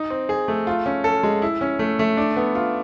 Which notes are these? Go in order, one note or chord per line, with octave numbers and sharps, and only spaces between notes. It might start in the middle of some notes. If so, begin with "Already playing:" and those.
Already playing: D#4
C4
G#4
A3
F4
C#4
A4
G#3
E4
C#4
A3
A3
D4
B3
F4